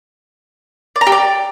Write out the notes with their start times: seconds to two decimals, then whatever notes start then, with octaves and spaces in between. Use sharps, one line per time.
0.96 D5
1.01 A#5
1.07 G4
1.12 D5